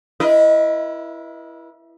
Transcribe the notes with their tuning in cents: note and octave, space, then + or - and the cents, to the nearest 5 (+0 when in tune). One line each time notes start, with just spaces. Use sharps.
E4 +15 B4 -40 D#5 +0